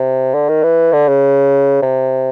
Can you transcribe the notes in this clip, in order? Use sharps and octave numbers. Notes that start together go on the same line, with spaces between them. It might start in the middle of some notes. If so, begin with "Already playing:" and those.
Already playing: C3
D3
D#3
E3
D3
C#3
C3